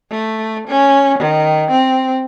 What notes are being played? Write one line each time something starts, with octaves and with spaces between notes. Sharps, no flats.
A3
C#4
D#3
C4